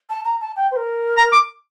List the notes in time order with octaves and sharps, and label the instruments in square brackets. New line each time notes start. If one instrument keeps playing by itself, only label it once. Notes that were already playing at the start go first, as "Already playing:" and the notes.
[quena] A5
A#5
A5
G5
C5
A#4
[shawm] A#5
D6